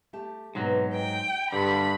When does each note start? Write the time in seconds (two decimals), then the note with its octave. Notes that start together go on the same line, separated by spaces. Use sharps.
0.13 A3 G4 A5
0.55 G#2 B2 F#3 C4 B4
0.95 D#5 F5 G5
1.52 G2 D3 B5